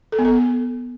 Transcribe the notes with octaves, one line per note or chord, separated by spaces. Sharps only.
A4
B3
A4